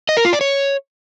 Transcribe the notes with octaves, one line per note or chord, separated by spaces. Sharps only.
D#5
A#4
F4
D5
C#5